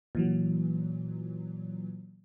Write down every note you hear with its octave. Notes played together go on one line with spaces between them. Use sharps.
A#2 E3 F#3